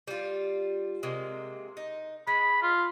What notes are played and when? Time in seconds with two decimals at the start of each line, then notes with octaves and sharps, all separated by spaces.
0.07 G3 F4
1.03 C3 G#3 A#3
1.77 D#4
2.27 G#3 B5
2.63 F4